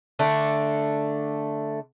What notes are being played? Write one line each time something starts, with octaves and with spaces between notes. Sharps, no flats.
D3 A3 D4